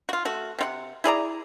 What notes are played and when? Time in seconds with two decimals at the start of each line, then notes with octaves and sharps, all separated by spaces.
0.09 F4 F#4
0.25 A3 F#4
0.59 C3 F4 F#5
1.04 E4 G#4 D5 A#5